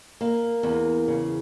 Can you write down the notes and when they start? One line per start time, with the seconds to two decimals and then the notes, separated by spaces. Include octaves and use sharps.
0.21 A#3
0.63 E2
1.08 C#3